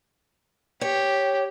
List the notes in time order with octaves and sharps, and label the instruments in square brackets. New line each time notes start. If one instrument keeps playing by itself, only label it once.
[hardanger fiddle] G4 [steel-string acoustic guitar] C#5